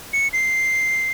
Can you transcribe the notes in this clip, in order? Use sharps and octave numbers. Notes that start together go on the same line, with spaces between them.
C#7
C7